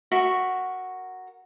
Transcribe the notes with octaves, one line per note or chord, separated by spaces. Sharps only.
F#4 A#4 E5 C#6